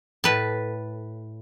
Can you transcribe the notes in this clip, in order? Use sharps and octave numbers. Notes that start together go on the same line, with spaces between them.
A2 B4 A5